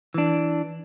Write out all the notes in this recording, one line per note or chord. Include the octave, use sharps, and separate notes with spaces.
E3 D4